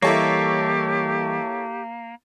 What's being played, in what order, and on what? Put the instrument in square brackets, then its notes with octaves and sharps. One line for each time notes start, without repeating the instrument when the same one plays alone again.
[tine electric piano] E3 G3 D#5 [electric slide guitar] A#3 [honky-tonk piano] E4 A4 C#5 [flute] G4